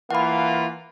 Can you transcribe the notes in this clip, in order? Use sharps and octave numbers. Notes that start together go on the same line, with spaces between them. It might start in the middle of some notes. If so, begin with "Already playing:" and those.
E3 A#3 F4 F#5 B5